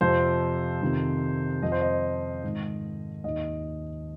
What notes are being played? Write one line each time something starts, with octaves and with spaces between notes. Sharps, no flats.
F2 C3 F3 C5
F2 C3 D#3
F2 F3 D#5
C5
D#5
G#2 D#3
D#2 D#3 D#5